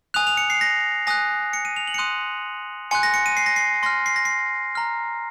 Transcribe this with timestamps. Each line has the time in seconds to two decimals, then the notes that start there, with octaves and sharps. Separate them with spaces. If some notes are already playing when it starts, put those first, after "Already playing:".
0.14 G#5 D#6 F#6 F7
0.27 F7
0.37 C#7
0.50 C7
0.61 A#6
1.07 G#5 D#6 F#6 A#6
1.53 C#7
1.65 D#7
1.76 F7
1.87 F#7
1.94 C#7
1.98 C6 D#6 F#6 D#7
2.91 G#5 C6 F#6 C#7
3.03 A#6
3.14 C#7
3.26 D#7
3.37 C7
3.46 A#6
3.56 C7
3.83 C6 F6 A#6
4.06 C7
4.16 A#6
4.25 C7
4.75 A#5 F6